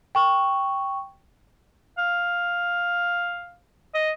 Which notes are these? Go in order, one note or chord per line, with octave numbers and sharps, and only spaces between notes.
G5 C#6
F5
D#5